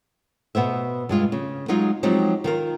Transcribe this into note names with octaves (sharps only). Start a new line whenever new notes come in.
B2 B3 C5 E5
G2 G#3 F4
C#3
F#3 G#3 D#4 F4
F3 F#3 G#3 C4 D#4 G4
D#3 F4 A#4